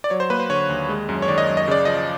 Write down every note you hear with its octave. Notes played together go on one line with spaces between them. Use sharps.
D5
F#3 C#5
C5
A#3 B4
C5
D3 C#5
D#2
G#3
F#2
C#5
D#3 D5
D#5
F#2
D#5
C#3 D5
F3 D#5